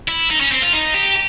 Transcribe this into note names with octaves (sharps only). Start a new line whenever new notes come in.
E4
D#4
C#4
C4
F4
D#4
G4